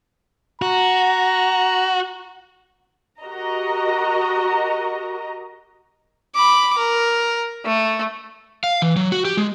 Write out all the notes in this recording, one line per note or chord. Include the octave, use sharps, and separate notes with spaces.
F#4 A#5
F#4 G4 A#4 D#5 A#5
B5 D6
A#4
A3
F5
E3
F#3
F#4
G4
G#3